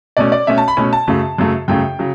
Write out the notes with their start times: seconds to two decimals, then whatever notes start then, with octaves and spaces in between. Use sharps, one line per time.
0.17 B2 A3 C#4 D5
0.32 D5
0.47 B2 A3 C#4 E5
0.58 A5
0.68 B5
0.77 B2 A3 C#4
0.93 A5
1.07 F#2 C#3 F#3 A3
1.38 F#2 C#3 F#3 A3
1.68 F#2 C#3 F#3 A3 G5
1.99 C#3 F#3